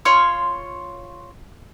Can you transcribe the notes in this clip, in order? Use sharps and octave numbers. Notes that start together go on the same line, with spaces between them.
F4 C#5 C6 F6